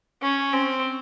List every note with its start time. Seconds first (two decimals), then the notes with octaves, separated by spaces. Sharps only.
0.22 C#4
0.53 C4